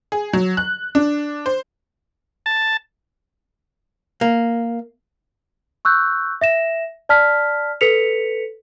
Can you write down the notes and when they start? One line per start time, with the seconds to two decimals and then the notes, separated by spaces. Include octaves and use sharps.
0.12 G#4
0.33 F#3
0.57 F#6
0.95 D4
1.46 C5
2.46 A5
4.21 A#3
5.85 C#6 E6 F#6 G6
6.41 E5 A#6 E7
7.09 D5 A5 F6 B6
7.81 A4 B4 B6 C#7 F7